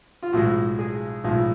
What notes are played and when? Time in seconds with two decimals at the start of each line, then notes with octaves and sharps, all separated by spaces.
0.23 F4
0.33 B1 A2 F3 G#3 F#4
0.79 G#4
1.24 B1 A2 F3 G#3